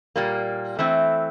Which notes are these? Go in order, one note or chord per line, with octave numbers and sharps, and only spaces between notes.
A#2 G3 A#3
E3 A3 C4 E4